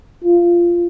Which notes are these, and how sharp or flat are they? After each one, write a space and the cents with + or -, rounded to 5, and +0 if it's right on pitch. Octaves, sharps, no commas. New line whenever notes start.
F4 -15